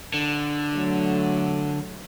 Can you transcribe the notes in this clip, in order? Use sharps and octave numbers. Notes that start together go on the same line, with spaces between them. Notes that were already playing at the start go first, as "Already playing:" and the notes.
D3
F#3 A3